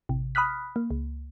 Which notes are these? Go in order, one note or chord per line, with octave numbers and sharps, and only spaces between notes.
A1 C3
B5 D#6 F6 F#6 B6
A#3
C#2